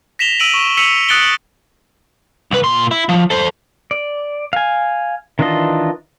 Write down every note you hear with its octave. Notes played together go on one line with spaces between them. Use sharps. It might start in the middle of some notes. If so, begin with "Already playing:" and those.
A#6 B6 E7 F7 G7
E6 D7 D#7 F#7
C#6
E6 B6 C#7 D#7 F7 F#7
D#6 F#6 A6 C#7 D7 G7
C2 B4
A#2 C6
E4
F3
A4 C5
D5
F5 G#5
D#3 E3 D4 F4 D#5